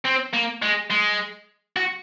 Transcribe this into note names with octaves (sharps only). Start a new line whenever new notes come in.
C4
A#3
G#3
G#3
F#4